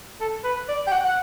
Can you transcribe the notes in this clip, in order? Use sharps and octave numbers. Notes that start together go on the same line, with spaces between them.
A4
B4
D5
G5
F#5
F#5